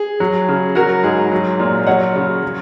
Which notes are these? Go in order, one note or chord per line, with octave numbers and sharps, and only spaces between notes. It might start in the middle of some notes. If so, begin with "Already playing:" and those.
Already playing: G#4
F#3
C#3
F#3 F#4 A#4
G#2 G#4
F#3
A#2
F#3 C#5 F#5
C#3
F#3